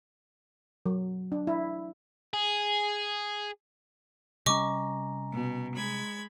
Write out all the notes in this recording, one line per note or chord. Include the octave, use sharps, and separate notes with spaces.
F#3
D4
E4
G#4
C3 G3 C#4 D#5 G#5 A#5 C#6 D6
B2
G#3 B5 G#6